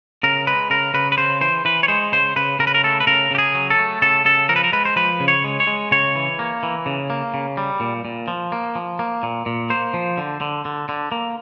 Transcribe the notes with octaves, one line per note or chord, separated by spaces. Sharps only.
C#3 A#4
G#3 B4
C#3 A#4
C#3 B4
B4
C#3 C5
E3 C5
E3 B4
C#5
G#3 C5
C#3 C5
C#3 B4
C#3 A#4
B4
A#4
A3 A4
B4
C#3 A#4
C#3 G4
G#4
F#3
A4
A3
C#3 A4
C#3 A4
F3 A#4
B4
A#4
G#3 B4
C5
F3 B4
C#3
C#5
G#3
C#5
G#3
C#3 C#5
E3
A#3
E3
C#3
A#3
C#3
G3
A#2
A#2
F3
A#3
F3
A#3
A#2
A#2
A#3 C5
F3
D3
D3
D3
D3
A#3